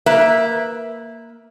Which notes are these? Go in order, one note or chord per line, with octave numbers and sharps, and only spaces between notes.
A#3 B4 E5